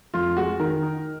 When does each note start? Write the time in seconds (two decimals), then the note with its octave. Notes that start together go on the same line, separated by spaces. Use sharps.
0.14 F2 F4
0.37 G#3 F#4
0.60 D#3 A#4
0.82 D#4